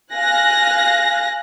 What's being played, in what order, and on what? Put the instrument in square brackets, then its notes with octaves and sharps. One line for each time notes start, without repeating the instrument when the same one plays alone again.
[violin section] F5 G#5 F#6 A#6